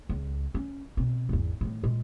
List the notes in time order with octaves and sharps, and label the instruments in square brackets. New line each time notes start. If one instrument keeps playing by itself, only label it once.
[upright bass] C#2
C#4
B2 C4
G#1 E2
A2 D#3
A#2 G#3